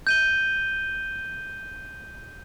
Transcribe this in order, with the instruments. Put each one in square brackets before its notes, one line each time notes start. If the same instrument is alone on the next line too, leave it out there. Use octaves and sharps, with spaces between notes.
[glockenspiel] G6 D#7 G7